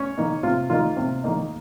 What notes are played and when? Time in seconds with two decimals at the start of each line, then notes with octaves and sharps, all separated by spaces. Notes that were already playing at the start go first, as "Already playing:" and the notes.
Already playing: C#4 C#5
0.18 D#3 A#3 D#4
0.43 C3 F4
0.70 D#3 A#3 D#4 F4
0.97 C3
1.24 D#3 A#3 D#4